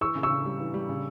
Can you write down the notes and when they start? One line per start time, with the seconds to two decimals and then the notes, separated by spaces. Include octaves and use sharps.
0.01 E3 C#6 E6
0.15 C#3
0.23 C#6 E6
0.31 C#3
0.45 G3
0.60 E3
0.74 G3
0.89 C#3